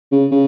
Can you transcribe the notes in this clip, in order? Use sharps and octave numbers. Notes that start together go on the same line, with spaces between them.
C#3
C#3